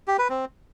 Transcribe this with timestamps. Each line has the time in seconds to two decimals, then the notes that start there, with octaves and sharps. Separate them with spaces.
0.08 G4
0.19 B4
0.30 C4